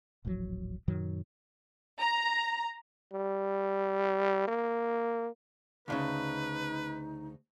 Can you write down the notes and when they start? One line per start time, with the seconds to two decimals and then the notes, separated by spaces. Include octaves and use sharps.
0.25 D#1 A1 F3 F#3
0.88 F#2 A#2 D#3 F#3
2.01 A#5
3.14 G3
4.48 A#3
5.88 D2 A#2 C#3 D#4 B4